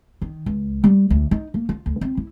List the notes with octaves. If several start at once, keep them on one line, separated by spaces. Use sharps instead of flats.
D#3
C#2
G3
D2
D#4
A#3
F4
D2
C4
E4